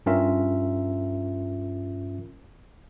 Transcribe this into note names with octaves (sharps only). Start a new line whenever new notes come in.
G2 C#4 F4 A#4 E5